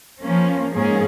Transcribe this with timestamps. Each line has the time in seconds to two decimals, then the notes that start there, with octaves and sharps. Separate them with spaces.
0.22 F3 A#3 C#4
0.73 G#2 F3 A#3 C#4 G#4